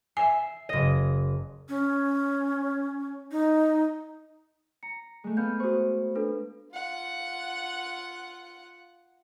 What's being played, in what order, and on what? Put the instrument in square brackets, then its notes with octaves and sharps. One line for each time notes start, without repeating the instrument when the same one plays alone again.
[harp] E5 C7 [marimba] G#5
[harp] F#1 D#5
[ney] C#4
D#4
[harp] A#5 [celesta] C#7
[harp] G#3 A3
[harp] B3 F5 [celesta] G6
[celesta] F#4 C5 [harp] C#6 D#6
[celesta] D4 A4 B4
[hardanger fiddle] F4 F#5